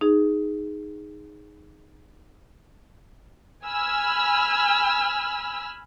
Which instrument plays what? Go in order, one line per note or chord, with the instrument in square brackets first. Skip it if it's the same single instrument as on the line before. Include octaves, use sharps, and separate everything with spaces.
[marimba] D#4 G#4
[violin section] G#5 B5 E6 F6